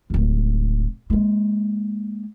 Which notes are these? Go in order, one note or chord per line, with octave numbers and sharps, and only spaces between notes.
D1 C#2
G#3 A#3